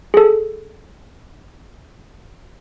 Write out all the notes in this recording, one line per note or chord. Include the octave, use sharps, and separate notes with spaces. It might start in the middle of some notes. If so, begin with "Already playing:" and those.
G#4 A4